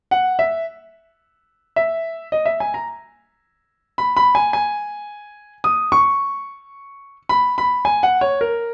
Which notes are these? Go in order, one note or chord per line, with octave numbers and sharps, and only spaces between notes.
F#5
E5
E5
D#5
E5
G#5
A#5
B5
B5
G#5
G#5
D#6
C#6
B5
B5
G#5
F#5
C#5
A#4